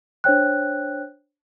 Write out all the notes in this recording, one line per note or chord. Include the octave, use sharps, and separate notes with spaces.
D4 C5 C#5 G5 F#6